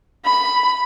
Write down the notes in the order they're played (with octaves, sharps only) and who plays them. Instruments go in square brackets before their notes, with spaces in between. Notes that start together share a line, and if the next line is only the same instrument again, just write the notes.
[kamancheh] B5